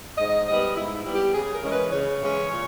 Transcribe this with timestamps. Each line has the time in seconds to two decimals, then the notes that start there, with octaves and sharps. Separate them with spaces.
0.18 G#2 D#5
0.47 G3 B3 D#5
0.76 G#2 E4
0.95 E4
1.05 G3 B3
1.14 G4
1.34 C#3 G#4
1.53 A#4
1.63 E3 G#3 C#4
1.72 B4
1.91 C#3 C#5
2.21 E3 G#3 C#4
2.50 A#2